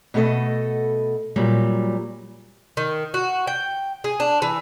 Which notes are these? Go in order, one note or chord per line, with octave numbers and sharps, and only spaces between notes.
B2 A3 B3 A4 C#5 D#5
A#2 F#3 G3
D#3
F#4
G5
G#4
D4
E3